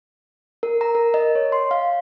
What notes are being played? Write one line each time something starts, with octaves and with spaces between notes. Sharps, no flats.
A#4
A#5
A#4
D#5
C#5
C6
F5